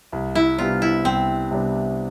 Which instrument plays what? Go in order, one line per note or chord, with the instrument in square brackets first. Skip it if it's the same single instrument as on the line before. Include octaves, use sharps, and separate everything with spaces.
[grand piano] C2
[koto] E4
[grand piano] C3 G3 B3 D4 [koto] F4
[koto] E4
[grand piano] C2 [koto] C4
[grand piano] C3 G3 B3 D4